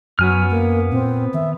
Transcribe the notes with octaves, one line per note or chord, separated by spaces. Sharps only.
F#2 F#3 B3 G#5 F6
A#3
A#2 C4
D#3 E5